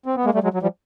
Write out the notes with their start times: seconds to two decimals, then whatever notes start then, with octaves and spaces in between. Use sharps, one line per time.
0.06 C4
0.16 B3
0.25 G#3 A#3
0.34 G3 A3
0.43 F#3 G#3
0.54 F#3
0.62 F3 G3